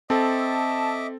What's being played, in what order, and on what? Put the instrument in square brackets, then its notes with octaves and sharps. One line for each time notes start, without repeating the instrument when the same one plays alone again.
[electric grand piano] C4 A4 [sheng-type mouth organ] D#5 E5 D6 [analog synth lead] A5